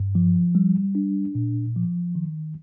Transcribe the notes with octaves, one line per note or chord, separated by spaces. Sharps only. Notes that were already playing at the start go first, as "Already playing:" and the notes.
Already playing: G2
F3
G3
D4
A#2
F3
D#3